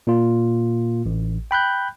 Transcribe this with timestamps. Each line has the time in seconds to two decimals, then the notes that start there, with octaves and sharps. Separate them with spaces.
0.07 A#2 A#3 F4
1.06 A1
1.51 G5 B5 F#6 G6